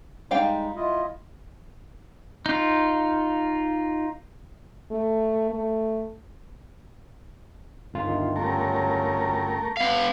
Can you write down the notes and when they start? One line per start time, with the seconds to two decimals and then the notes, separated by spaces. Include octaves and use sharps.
0.31 G3 G#3 D#4 F5 G5
0.76 E4 F4 D#5
2.46 D#4 F4
4.91 A3
5.50 A3
7.94 G1 D2 D#3 F4
8.36 F#3 G3 A3 C#4 A#4
9.77 B3 F5